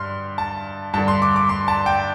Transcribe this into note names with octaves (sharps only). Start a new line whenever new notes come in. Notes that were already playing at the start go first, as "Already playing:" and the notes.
Already playing: G2 C6 F6
A5
G2 D3 A5
C6
D6
D6
C6
A5
G5